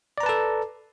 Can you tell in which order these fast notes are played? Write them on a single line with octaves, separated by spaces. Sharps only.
D5 A#5 B4 A5 A4